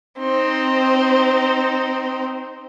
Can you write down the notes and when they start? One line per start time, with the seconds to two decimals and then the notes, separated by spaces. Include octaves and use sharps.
0.19 C4 D#4